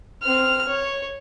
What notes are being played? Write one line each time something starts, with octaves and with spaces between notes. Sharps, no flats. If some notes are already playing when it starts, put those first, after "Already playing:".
C4 F6
C#5